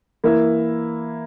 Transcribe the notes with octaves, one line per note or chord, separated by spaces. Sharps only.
E3 A#3 E4 A#4 E5